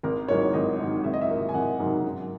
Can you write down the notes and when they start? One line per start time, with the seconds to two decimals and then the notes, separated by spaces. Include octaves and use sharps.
0.03 G#1 A#4
0.28 G#2 D#3 F#3 A#3 C#5
0.53 G#1 D#5
0.79 G#2 D#3 F#3 A#3
1.04 G#1 E5
1.14 D#5
1.21 E5
1.29 G#2 D#3 F#3 A#3
1.49 G#5
1.54 G#1 F#5
1.80 G#2 D#3 F#3 A#3
2.05 F#2